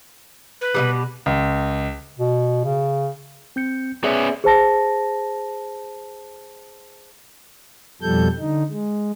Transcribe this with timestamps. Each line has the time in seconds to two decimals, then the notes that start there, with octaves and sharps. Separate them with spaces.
0.61 B4
0.74 B2 E3 G3
1.26 C#2
2.19 B2
2.64 C#3
3.56 C4 G6 C#7
4.04 B3 C#4 G#4 D5 E5
4.44 G#4 C5 A5 A#6
8.02 F2 B2 F3 G3 A4 G6
8.39 D3 D#4
8.70 G#3